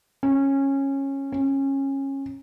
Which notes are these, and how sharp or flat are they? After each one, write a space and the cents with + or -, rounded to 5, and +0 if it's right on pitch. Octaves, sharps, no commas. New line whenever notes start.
C#4 -15
C#4 -20